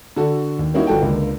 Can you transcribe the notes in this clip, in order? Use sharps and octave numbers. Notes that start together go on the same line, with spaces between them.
D3 F#4 A4
D#2
G3 A#3 C#4 D#4 E4 F#4
G1 F#4 A4 G5
C#2 D3 A#3